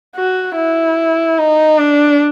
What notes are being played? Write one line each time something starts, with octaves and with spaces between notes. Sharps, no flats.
F#4
E4
D#4
D4